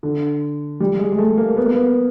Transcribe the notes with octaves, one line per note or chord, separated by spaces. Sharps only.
D3
G3
G#3
G#3
A3
A#3
B3
A#3
B3